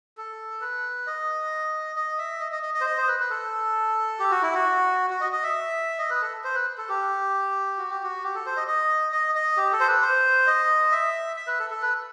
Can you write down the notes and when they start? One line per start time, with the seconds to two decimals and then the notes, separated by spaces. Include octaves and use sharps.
0.17 A4
0.61 B4
1.07 D#5
1.96 D#5
2.19 E5
2.40 D#5
2.52 D#5
2.63 D#5
2.74 D#5
2.81 C5
2.86 D#5
2.97 C5
3.08 B4
3.20 B4
3.30 A4
4.19 G4
4.31 F#4
4.42 E4
4.54 F#4
5.10 F#4
5.21 D#5
5.32 D#5
5.43 E5
5.99 D#5
6.10 B4
6.21 A4
6.44 C5
6.55 B4
6.78 A4
6.89 G4
7.78 F#4
7.90 G4
8.03 F#4
8.24 G4
8.35 A4
8.46 C5
8.57 D#5
8.68 D#5
9.12 D#5
9.35 D#5
9.57 G4
9.73 A4
9.80 C5
9.88 B4
10.02 C5
10.47 D#5
10.92 E5
11.36 E5
11.47 B4
11.59 A4
11.70 A4
11.82 B4